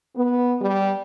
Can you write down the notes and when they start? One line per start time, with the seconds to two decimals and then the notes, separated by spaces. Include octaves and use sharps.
0.15 B3
0.61 G3